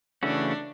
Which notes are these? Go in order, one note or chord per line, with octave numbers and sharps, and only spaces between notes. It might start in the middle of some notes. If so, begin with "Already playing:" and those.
C#3 E3 A3 C#4 D4 F#4